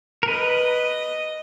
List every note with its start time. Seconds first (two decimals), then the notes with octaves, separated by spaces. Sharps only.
0.23 A#4
0.28 B4 D#5